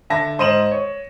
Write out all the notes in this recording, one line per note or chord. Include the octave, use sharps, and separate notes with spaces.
D3 E5 A5 A#6
G#2 C5 D#5 D#7 E7 F#7
C#5